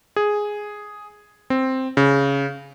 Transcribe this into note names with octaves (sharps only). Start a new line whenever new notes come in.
G#4
C4
C#3